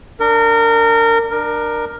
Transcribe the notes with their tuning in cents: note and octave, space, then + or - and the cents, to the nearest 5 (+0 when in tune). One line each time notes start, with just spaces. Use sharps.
D4 +0 A#4 -25
D4 +25 A#4 +5